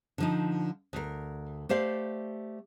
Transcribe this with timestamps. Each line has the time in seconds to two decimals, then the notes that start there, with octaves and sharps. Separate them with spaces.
0.18 D3 F3 D#4
0.93 D2 A#4
1.69 A3 G4 C5 D5 F5